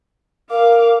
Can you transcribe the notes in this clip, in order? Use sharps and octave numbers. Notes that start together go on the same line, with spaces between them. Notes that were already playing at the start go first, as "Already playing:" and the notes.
A#4 F5 D6